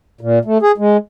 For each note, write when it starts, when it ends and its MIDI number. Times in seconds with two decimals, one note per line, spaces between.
0.21 0.39 46
0.45 0.58 57
0.62 0.72 68
0.78 0.97 56